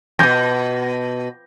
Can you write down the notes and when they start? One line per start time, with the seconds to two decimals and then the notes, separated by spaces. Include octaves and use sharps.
0.19 F2 B2 G6 A#6